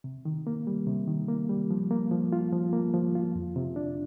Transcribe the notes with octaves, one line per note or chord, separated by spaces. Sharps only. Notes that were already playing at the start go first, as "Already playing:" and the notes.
C3
D#3
A#3
G3
C3
D#3
A#3
G3
F3
A#3
F3
F4
F3
A#3
F3
F4
F2
C3
D4